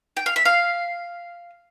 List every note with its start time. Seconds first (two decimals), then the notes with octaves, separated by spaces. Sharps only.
0.17 G5
0.26 F5
0.36 E5
0.45 F5